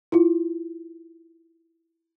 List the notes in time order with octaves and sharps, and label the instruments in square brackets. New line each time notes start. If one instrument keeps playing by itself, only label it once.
[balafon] E4 F4